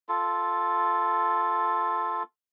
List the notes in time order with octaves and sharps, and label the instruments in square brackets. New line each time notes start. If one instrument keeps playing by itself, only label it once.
[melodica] F4 A4